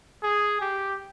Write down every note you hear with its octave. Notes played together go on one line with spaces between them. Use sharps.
G#4
G4